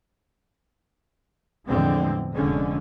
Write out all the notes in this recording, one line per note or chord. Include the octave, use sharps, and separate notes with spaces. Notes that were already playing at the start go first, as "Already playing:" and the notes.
E2 A2 D3 F3 G#3 C4
F1 D3 G#3 C#4